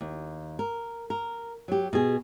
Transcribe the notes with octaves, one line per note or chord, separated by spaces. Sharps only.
D#2
A#4
A#4
F#3 G4
B2 G#4